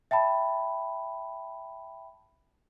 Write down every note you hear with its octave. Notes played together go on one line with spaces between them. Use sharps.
E5 G5 A5 B5